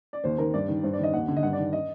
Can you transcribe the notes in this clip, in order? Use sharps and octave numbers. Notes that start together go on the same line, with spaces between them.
D5
D#2 C5
D#3 A#4
G2 D5
D#3
G2 C5
D5
D#3 D#5
D#2 F#5
D3
D#5
G2 F#5
D5
D#3
D#5